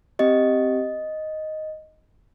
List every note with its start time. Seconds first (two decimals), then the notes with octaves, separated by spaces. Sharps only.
0.19 C4 G4 D#5